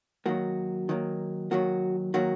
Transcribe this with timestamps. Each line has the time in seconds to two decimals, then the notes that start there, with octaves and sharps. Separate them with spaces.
0.26 D#3 F#3 A#3 F#4
0.89 D#3 F#3 A#3
1.51 D#3 F#3 A#3 F#4
2.14 D#3 F#3 A#3 F#4